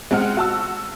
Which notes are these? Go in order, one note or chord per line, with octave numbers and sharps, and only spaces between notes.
G#3 C4 F#5 F6
F#4 A5 E6